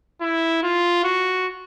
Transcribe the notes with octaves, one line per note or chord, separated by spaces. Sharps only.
E4
F4
F#4